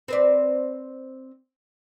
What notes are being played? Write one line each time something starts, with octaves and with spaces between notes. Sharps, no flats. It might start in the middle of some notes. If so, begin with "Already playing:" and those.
C4 B4 D5